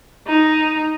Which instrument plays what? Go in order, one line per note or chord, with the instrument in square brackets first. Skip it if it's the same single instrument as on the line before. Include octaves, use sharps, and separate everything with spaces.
[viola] D#4